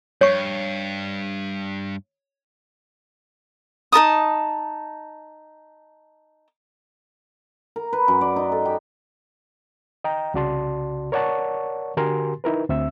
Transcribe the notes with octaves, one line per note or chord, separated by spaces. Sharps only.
G2 C#5 C#6
D#4 A#4 A5 D#6
A#4
B4
F#2
D5
D#4
A4
G4
D#5 G5 A#5
C2 C#3 F#4 D5 A5 C6
A#4 C#5 D5 F#5 A5 C#6
D3 F#4 G4 A#4 G#5 C6
D#4 E4 A#4 B4
D2 C4 E5 E6